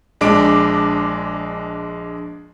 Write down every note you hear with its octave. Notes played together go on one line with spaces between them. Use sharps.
A#1 G#3 D4 D6 D7